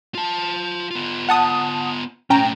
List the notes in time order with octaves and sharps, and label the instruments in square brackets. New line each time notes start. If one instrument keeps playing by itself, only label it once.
[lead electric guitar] F4 A5
B3 F4
[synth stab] F#5 A5 D#6
[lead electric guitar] B1 A2 [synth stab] C#4 G5 A#5